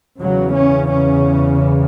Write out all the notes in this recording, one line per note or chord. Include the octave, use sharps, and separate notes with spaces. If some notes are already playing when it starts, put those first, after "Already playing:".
E2 C#3 F#3
C#4
C#4